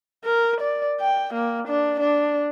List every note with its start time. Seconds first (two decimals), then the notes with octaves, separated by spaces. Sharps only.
0.24 A#4
0.61 D5
1.00 G5
1.34 A#3
1.68 D4
2.00 D4